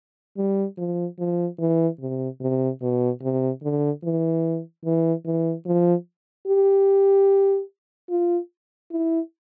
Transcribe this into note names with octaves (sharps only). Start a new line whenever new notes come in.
G3
F3
F3
E3
C3
C3
B2
C3
D3
E3
E3
E3
F3
G4
F4
E4